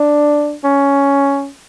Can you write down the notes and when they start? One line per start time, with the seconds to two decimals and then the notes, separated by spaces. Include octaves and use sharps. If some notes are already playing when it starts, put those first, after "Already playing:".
Already playing: D4
0.64 C#4